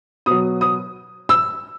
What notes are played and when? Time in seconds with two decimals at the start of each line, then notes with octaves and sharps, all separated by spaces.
0.26 B2 F#3 D#6
0.61 D#6
1.29 E6